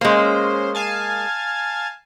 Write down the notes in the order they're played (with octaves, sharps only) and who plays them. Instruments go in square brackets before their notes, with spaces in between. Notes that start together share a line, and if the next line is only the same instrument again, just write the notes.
[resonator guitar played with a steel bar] G#3 A#3 [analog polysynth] C#4 C5
[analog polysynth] F5 G#5 A5